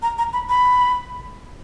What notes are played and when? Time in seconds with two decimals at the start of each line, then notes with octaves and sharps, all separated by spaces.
0.02 A#5
0.18 A#5
0.33 B5
0.49 B5